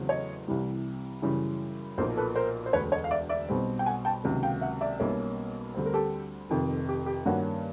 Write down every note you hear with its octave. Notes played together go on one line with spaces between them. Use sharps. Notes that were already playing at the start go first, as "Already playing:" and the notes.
Already playing: E2 C#3 F#3 A3 C4
C#5 D#5
C2 C3 E3 G3
F#2 C#3 E3 G3
B1 A#2 F3 A#3 A#4 C5
A4 B4
A#4 C5
C5
E1 D2 D3 B4 C#5
C#5 D#5
F5
D5 E5
D5 E5
B1 B2 G3 C4
G5
F#5 G#5
G5 A5
C#2 C3 D#3 F#3 A#3
F5 G5
E5 F#5
D5 E5
B1 B2 G3 A#3 C#4
D2 D3 G3 C4
A#4
G4 A4
F1 F2 C3 D#3
G4
G4
G2 D#3 G3 A#3 C#4 F#4